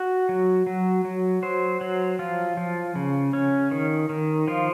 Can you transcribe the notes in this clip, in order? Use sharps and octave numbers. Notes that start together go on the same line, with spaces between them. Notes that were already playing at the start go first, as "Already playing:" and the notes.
Already playing: F#4
F#3
F#3
F#3
F#3 C5
F#3
F3 F4
F3
C#3
C#4
D#3
D#3
F3 F4